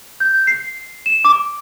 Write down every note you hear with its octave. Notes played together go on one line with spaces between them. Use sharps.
G6
C7
E7
D6